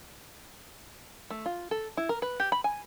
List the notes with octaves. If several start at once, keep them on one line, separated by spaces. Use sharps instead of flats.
A3
F4
A4
E4
A#4
B4
G4
B5
G#5